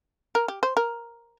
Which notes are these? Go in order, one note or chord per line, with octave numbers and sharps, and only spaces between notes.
A#4
G4
C5
A#4